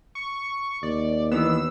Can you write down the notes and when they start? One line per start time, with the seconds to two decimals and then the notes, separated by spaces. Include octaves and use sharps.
0.15 C#6
0.83 D#2 D5
1.32 D#3 E3 B3 E6